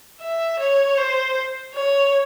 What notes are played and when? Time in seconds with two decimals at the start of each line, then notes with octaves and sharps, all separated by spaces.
0.20 E5
0.60 C#5
0.97 C5
1.75 C#5